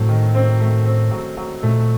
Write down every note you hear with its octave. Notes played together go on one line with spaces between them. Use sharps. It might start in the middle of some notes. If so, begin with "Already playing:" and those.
Already playing: A2 F#3 A3 C4
D#3
C4
A3
C4
F#3
F#3
A#2 A3